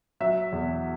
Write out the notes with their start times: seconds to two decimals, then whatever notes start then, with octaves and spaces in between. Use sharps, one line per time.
0.20 F#3 E5
0.52 E2